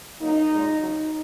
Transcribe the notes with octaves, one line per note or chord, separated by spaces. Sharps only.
F#2 F#3 A#3 D#4
A#2 G#3
D#2 C#3 F#3 D#4